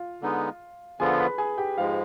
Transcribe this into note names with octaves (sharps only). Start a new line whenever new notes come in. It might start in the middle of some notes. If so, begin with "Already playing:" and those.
Already playing: F4 F5
D3 G#3 B3 D#4
D3 F3 B3 F4 G#4 G#5
B4 B5
G#4 G#5
G4 G5
G#2 F3 G#3 F4 F5